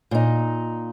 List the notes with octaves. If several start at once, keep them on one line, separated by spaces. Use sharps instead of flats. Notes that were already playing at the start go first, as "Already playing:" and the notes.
A#2 D#4